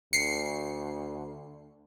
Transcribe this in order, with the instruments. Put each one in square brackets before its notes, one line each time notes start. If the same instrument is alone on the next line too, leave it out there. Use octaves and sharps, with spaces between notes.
[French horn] D2 [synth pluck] C7 C#7